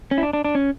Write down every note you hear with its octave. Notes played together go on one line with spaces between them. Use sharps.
C#4
E4
D4
D4
D4
C#4